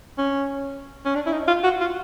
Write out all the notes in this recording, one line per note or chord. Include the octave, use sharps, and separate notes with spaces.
C#4
C#4
D4
E4
D#4
F4
F#4
F4